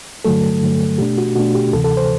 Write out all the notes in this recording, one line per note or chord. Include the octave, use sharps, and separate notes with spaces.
G2 D3 F#3 A3 A4
G2 D3 F#3 A3
B2 A3 D4 G4
F#4
B2 A3 D4 F#4
G4
D2 C3 E3 A4
A4
C5